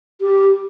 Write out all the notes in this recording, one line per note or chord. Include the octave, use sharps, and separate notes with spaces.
G4